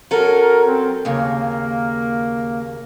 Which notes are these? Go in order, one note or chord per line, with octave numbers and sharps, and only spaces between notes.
F#3 C#4 A4 A#4
C4
D#2 C#3 A#3